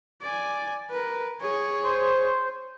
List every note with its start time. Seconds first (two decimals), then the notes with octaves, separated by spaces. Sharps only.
0.22 D5 G#5
0.91 A#4 B4
1.41 G#4 C#5
1.84 C5